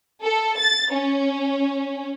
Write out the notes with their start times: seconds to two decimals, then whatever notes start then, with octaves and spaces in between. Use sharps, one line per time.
0.22 A4
0.58 A6
0.91 C#4